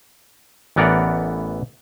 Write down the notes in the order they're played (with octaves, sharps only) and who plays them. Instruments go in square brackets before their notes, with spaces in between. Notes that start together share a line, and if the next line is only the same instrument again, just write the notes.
[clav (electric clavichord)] A1 E3 B3 A#4 D5 F#5